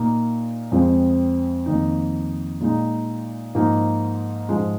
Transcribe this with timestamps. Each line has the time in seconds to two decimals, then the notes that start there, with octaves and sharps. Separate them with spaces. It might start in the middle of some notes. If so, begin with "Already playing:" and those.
Already playing: A#2 A#3 D#4
0.72 F2 F3 G#3 C4
1.66 F2 D#3 A#3 D#4
2.61 A#2 G#3 D#4
3.55 G#2 F3 A#3 D#4
4.49 G#2 F3 G#3